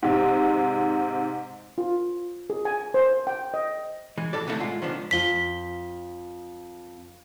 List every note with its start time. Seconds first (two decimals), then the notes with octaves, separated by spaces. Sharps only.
0.03 G#2 C3
1.78 F4
2.50 G#4
2.65 G#5
2.94 C5
3.27 G5
3.54 D#5
4.18 E3 G#3
4.33 A2 E3 A4 D5
4.47 C2 D3 E3 G#3 A3 E4
4.60 A2 G#3 F4 F#5
4.82 D#3 F3 B3 D4
5.11 F2 F4 B6 G7